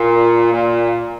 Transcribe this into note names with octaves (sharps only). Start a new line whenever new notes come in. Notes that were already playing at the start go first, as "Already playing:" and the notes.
Already playing: A#2
A#2